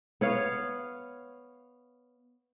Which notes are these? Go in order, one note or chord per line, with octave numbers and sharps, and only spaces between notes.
B3 C#5 F5